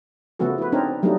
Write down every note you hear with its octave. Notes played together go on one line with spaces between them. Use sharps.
C#3 F3 A3 B3 F#4 A4
E4 B4
C4 D4 D#4 A#4 C#5
F#3 G3 A3 A#3 D4 D#4